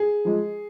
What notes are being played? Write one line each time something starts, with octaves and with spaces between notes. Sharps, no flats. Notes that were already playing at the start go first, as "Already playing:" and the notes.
Already playing: G#4
F3 G#3